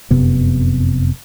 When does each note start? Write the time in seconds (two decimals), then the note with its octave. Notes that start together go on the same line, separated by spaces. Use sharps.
0.11 F1 F#2 C3 B3